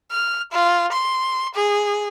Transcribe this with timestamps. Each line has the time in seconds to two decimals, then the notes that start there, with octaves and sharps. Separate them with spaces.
0.11 F6
0.52 F4
0.92 C6
1.55 G#4